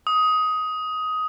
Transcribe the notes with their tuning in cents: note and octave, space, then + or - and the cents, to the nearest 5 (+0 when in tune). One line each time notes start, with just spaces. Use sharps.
D#6 +15